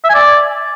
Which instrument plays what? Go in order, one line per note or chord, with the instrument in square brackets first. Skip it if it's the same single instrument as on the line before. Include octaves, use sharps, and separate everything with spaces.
[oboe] E5
G#5
D5